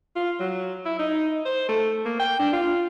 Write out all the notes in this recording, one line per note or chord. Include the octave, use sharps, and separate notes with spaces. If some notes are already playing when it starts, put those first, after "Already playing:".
F4
F#3
E4
D#4
C5
A3
A#3
G5
D4
F4